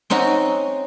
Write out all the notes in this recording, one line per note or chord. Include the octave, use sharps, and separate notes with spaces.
C4 C#4 D#4 F#4